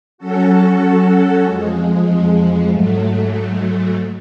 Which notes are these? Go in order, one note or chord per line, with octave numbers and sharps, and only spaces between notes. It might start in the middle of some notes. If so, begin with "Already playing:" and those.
F#3 C#4 F#4 A4
F2 F3 G#3
G#2 F#3 A3